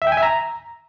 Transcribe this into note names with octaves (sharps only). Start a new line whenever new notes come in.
E5
G5
G#5
E5
A#5